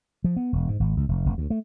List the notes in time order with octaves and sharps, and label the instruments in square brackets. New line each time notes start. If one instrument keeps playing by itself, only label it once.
[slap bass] F3
B3
E1
G#2
G#1
C#2
F1
F1
D2
A3